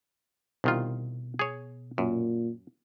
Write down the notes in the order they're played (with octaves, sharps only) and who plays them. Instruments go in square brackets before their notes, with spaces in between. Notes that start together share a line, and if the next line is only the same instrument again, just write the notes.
[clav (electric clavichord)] C2 D#3 F4 [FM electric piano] B2
[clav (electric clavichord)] G#4 C#5
[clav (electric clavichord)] F#2 [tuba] A#2